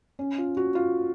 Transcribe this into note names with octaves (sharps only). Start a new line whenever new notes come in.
C#4
F4
F#4
F4